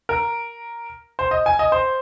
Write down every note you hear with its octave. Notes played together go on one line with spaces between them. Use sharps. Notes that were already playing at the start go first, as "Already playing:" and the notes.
A#4
C5
D#5
G#5
D#5
C5